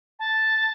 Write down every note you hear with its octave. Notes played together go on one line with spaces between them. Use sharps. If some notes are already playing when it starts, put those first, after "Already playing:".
A5